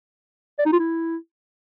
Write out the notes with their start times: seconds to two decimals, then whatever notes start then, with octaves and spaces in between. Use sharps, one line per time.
0.59 D5
0.66 D#4
0.73 F4
0.80 E4